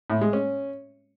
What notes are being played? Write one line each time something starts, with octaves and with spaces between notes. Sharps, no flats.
A2
G#3
C#4